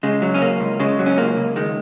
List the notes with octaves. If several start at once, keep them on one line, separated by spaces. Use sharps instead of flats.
C#3 G#3
F#3
C#4
C#2 A#3
C#2
C#3 G#3
F#3
C#4
C#2 A#3
C#2
D#3 G#3